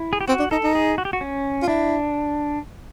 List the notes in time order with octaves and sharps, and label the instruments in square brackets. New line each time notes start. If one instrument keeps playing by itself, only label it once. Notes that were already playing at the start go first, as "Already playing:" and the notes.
Already playing: [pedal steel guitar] E4
G#4
G4
[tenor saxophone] C4 [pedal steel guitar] F#4
[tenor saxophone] D4
[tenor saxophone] D#4 [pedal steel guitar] A4
[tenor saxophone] D#4
[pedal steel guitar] G#4
F#4
G4
F#4
C#4
[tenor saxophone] F4
[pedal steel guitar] D4 [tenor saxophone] E4